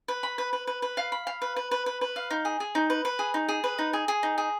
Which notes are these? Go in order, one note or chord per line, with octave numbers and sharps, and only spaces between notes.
B4
B5
B4
B4
B4
B4
F5
B5
F5
B4
B4
B4
B4
B4
F5
D#4
G#4
G#4
D#4
B4
B4
G#4
D#4
G#4
B4
D#4
G#4
G#4
D#4
G#4